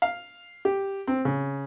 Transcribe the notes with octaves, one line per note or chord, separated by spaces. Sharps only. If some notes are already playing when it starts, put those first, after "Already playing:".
F5
G4
C4
C#3